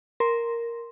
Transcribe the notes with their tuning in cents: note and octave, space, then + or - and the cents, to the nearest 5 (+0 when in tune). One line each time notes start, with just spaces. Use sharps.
A#4 +0 C6 +0